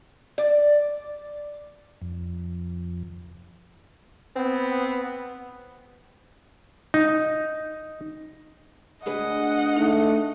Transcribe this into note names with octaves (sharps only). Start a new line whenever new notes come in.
D5
F2
B3 C4
D#4
D2 G#4 B4 D#5 F#5
A3 D#4